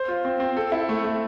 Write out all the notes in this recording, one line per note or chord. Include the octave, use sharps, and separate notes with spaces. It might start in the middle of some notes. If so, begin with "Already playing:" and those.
Already playing: C5
F4
C4
C4
A4
E4
A3
A3